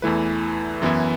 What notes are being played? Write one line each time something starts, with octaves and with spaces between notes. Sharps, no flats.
E2 E3 A3 E4 B4
F#2 E3 B3 E4